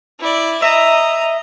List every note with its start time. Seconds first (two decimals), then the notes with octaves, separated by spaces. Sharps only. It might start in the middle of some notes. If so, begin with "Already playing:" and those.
0.20 E4 D5
0.62 D#5 E5 A#5